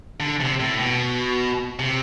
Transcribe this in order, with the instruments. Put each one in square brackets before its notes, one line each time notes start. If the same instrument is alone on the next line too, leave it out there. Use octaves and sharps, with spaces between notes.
[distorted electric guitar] D3
C3
A2
B2
C3